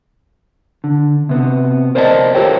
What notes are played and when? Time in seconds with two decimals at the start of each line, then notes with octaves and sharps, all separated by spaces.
0.84 D3
1.29 C3 B3
1.95 A#4 C5 D5 D#5 F#5 A5
2.35 F4 G4 A4 A#4 C#5 G5